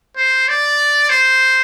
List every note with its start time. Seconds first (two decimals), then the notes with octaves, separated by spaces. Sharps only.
0.17 C5
0.48 D5
1.09 C5